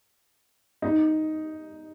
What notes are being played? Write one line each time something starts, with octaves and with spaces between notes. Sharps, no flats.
D#4